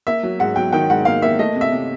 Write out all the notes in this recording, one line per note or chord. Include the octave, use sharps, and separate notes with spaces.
A#3 E5
F#3
G#2 F#5
F#3 G5
D#3 G5
G#2 F#5
A#3 F5
A#3 E5
A3 D#5
C3
E5
C3